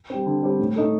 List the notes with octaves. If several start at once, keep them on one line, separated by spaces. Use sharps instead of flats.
G3 C4
D3
G3 C4
A2
A3 D#4 A4